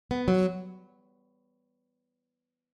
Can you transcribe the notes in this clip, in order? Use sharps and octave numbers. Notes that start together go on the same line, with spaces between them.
B3
F#3